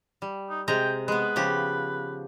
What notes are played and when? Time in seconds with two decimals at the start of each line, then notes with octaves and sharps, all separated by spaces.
0.22 G3
0.50 D#4
0.68 C3 G#3 G5 A#5
1.08 G#3 B3 B4
1.36 C#3 F3 G4